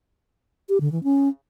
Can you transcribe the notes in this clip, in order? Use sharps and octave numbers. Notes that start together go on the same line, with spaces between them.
G4
D3
E3
C#4